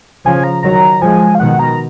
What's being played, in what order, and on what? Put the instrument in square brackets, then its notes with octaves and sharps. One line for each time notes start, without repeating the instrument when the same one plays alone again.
[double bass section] C#3 F3 [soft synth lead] G#5
[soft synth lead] A#5
[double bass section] D#3 F#3 [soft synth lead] A#5
[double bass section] F3 G#3 [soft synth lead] G#5
[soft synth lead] F5
[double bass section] B2 D#3 [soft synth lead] F#5
[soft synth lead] A#5